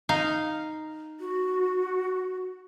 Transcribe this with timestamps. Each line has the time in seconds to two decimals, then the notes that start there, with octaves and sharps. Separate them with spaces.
0.09 D#4 F5
1.20 F#4